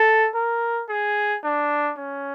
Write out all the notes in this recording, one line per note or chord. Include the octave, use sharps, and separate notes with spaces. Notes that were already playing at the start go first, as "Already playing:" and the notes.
Already playing: A4
A#4
G#4
D4
C#4